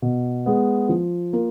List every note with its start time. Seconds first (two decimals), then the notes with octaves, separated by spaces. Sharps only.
0.02 B2
0.46 G#3 B3
0.89 F3
1.33 A#3 F4